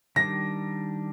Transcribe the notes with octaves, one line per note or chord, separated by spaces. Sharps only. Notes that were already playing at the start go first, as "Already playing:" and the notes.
D#3 G3 D4 A#6